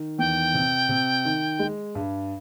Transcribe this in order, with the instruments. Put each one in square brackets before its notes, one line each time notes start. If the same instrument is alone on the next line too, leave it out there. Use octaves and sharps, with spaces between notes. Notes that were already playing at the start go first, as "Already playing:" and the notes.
Already playing: [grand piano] D#3
[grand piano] E2 [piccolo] G5
[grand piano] C3
C3
D#3
G#3
G2